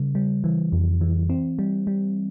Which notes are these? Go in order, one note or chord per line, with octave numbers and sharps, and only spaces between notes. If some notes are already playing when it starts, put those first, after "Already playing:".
Already playing: C#3 G3
G3
E3
F2
E3
C4
G3
G3